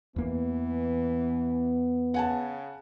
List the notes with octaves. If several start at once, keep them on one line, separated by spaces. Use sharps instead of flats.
E2 E3 A#3 B3
C#3 F#5 G#5 A5